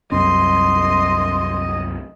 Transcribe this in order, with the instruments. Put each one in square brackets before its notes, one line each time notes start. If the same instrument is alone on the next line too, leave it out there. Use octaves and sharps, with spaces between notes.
[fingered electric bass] C2 F#2 C#4 [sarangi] D#5 [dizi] C6